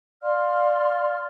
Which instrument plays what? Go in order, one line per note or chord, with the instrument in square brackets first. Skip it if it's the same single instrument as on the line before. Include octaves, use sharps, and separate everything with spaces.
[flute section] D5 F5 C6 F6